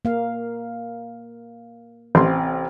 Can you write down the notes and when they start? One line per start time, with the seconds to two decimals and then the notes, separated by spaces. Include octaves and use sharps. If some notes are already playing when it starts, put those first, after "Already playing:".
0.05 A#3 F5
2.15 A1 C4 C6